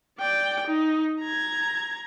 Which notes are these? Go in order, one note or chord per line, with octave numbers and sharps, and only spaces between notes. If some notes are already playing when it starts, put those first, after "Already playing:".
D5 G5
D#4
A#5 G#6